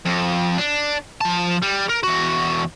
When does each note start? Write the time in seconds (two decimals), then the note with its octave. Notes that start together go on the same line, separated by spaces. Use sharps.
0.05 F2
0.58 D4
1.21 F3 A5
1.62 G3
1.89 A#4
2.03 E2 F#4